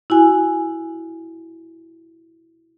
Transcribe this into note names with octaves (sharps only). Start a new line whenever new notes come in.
E4 F#4 G#5